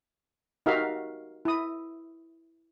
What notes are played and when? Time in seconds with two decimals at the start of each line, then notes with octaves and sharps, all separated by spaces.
0.66 D#4 F#4 G4 A#4 E5 F5
1.45 E4 D#6